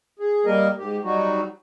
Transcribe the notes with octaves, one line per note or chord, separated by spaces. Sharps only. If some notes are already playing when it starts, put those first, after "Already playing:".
G#4
G3 A#3 A#4 D#5
G#2 G4
F#3 G3 D#4 F#4